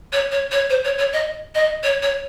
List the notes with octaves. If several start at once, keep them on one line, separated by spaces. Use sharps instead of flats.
C#5
C#5
C#5
C5
C#5
C#5
D#5
D#5
C#5
C#5